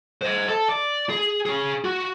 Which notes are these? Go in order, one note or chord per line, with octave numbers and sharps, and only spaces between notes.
C5 D#5
A4
D5
G#4
C#4 G#4
F#4